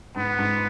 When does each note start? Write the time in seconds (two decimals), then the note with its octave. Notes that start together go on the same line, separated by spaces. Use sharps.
0.16 G#2 B3
0.39 G#2